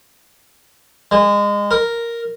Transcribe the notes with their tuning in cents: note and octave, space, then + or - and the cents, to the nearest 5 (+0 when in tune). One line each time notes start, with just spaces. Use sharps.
G#3 -25
A#4 +0